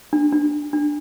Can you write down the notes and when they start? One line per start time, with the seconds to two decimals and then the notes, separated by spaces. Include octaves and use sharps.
0.13 D4
0.32 D4
0.73 D4